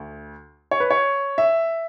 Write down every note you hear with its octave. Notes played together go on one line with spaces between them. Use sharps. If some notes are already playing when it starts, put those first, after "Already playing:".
Already playing: D2
C#5
B4
C#5
E5